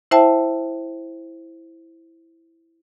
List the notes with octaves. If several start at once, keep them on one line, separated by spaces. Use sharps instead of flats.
E4 C5 E5 G5 A5